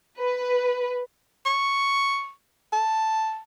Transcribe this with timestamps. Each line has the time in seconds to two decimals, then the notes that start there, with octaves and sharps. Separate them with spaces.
0.17 B4
1.46 C#6
2.73 A5